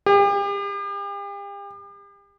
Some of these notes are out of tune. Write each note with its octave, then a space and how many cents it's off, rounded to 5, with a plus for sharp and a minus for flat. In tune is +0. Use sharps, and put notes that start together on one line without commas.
G4 +40